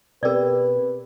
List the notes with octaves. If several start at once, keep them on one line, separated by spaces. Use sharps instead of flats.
B2 C4 G4 A#4 B4 D5